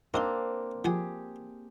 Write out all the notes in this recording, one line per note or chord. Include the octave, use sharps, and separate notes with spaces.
A#3 C4 D4 D#4 D#5 C6
F3 G4 G#4 F#5 G#5